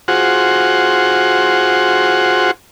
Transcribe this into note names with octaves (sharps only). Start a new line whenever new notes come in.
F4 F#4 G#4 C5 F#5